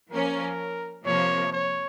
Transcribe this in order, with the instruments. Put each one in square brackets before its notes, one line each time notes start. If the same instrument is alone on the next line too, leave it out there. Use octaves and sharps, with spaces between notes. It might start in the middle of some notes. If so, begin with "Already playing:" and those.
[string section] F3 A#3 C#4 [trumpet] A#4
[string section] C3 F3 A#3 [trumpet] C#5
[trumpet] C#5